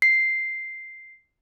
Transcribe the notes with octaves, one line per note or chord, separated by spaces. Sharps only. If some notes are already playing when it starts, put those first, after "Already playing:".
C7